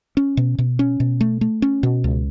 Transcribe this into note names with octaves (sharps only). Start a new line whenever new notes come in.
C#4
B2
B2
C#4
B2
A3
A3
C#4
B2
C#2